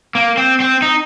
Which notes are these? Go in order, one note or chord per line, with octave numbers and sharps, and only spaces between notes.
A#3
C4
C4
D#4